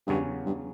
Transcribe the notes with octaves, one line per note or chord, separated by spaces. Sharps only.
E2 G2 C#3 F#3 C#4 F#4
G2